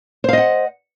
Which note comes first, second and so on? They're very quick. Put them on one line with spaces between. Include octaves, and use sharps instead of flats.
C5 F5 D#5 F#5